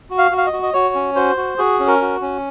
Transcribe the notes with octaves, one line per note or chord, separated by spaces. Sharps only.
F#4
F5
F#4
F5
D#5
F#4
D#5
F#4 C#5
C#4
F#4 C5
F#4
F#4 G#4
C#4
A#4
F#4
C#4